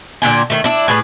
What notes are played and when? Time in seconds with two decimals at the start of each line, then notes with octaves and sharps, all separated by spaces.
0.22 A#2 D3 G5 G#5
0.50 D#3 A3
0.64 D4 E4
0.88 A2 G#4 B4